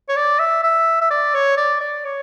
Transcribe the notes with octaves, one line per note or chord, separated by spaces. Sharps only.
C#5
D5
E5
E5
E5
D5
C#5
D5
D5
C#5